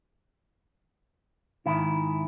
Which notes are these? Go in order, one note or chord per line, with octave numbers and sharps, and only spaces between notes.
G#2 D#3 E4